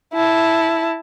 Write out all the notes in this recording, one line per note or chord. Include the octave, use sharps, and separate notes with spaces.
E4 A5